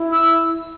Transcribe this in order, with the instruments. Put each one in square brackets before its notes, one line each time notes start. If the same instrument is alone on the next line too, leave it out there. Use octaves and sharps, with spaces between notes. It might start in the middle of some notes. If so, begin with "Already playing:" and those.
Already playing: [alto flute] E4
[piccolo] E6